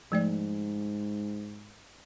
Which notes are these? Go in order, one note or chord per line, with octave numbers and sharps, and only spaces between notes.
G#2 F3 A3 D5